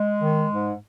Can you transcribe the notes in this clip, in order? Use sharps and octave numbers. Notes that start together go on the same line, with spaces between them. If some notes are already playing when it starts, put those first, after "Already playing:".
Already playing: G#3
D#3
G#2